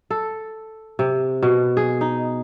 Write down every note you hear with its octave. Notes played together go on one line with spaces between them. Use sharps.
A4
C3
B2
G#4
D#4